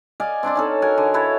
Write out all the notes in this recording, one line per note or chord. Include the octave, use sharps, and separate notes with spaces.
D5 D#5 F5 G#5
C4 D4 C5 D5
C#4 D#4 A4
F#4 A#4 G#5
D3
E4 A4 B4 C#5